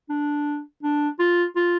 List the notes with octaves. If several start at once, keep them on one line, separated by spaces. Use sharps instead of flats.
D4
D4
F4
F4